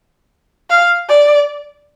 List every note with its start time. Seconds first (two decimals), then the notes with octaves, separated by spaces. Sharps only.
0.70 F5
1.09 D5